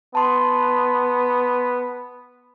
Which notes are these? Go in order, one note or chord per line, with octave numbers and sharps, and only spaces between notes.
B3 A5 C6